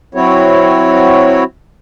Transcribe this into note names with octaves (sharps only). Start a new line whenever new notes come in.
F#3 C4 E4 F#4 C#5